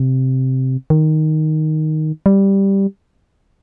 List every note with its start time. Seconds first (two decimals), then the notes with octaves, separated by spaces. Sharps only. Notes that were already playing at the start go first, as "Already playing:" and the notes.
Already playing: C3
0.90 D#3
2.26 G3